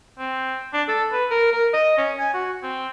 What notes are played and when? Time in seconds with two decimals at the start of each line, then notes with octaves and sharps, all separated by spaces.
0.19 C4
0.73 D4
0.88 A4
1.12 B4
1.31 A#4
1.52 A#4
1.74 D#5
1.98 C#4
2.19 G#5
2.34 F#4
2.63 C4